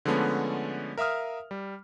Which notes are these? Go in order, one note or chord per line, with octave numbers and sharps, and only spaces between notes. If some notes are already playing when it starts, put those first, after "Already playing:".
D3 F3 G#3 A3 B3 C#4
A#4 E5 F5 D#6 F6
G3